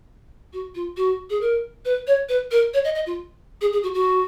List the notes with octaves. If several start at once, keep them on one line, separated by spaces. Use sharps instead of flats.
F#4
F4
F#4
G#4
A#4
B4
C#5
B4
A#4
C#5
D#5
D#5
F4
G#4
G#4
F#4
F#4